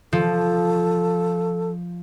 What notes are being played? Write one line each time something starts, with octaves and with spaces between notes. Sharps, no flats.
F3 A4